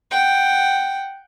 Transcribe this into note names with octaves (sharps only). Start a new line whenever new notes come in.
F#5 G5